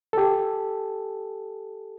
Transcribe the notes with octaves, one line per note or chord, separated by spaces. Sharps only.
G4 A4